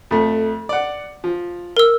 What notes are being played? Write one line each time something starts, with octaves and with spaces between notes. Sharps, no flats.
F2 A3
D5 F#5
F3
A#4 E6